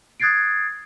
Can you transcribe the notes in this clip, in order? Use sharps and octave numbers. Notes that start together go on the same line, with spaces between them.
D#6 F#6 G#6 A6 C7 D7